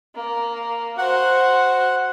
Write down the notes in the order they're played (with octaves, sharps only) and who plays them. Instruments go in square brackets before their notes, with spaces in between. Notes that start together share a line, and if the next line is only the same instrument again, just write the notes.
[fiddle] A#3
[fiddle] F#4 C5 [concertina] F#5